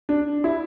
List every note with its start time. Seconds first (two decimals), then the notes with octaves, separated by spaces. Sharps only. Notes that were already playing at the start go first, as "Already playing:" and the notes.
0.09 D4
0.44 E4